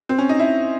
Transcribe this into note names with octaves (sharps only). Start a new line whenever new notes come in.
C4
C#4
D#4
E4